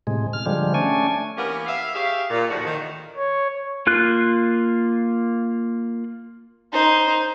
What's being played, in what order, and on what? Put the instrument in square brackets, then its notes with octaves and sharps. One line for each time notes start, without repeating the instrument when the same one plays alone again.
[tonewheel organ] A2 C3 G#3
F6
D3 F3 G3 G#3
A3 C#4 D4 G#5
[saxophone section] E3 A#3 B3 C#4 G4 A#4
E5 F5
G4 G#4 C#5 E5 F5
A#2
D#2 A2 D3 F3 F#4
D#3
[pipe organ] C#5
[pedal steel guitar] A#3 F4 F#6
[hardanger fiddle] D#4 C5